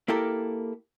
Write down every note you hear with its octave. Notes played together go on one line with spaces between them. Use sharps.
A#3 E4 G4 A4 A#4